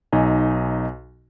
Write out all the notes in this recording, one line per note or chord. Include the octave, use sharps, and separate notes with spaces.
B1 D#4 D#5 G#5